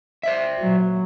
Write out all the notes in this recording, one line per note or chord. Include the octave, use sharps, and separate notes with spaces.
C5 D5 E5
A#2 F#3